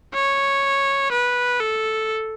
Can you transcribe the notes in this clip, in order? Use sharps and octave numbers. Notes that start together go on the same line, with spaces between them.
C#5
B4
A4